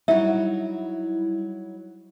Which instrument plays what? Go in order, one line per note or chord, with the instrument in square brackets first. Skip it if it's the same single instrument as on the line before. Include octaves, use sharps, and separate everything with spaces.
[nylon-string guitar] F#3 D#4 [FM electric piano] G3 E4 [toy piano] E5